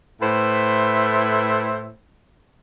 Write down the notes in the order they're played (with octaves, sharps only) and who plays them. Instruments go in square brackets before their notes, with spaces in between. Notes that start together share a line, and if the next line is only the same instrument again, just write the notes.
[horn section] A2 B4 C5 E5